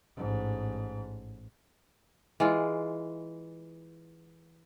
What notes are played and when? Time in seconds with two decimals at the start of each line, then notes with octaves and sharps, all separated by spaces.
0.16 A1 G#2
2.40 E3 G#3 F4